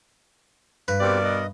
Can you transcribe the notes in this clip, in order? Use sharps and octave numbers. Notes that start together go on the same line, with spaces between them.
G2 B4
B2 C4 G4 A#4 D5
D#5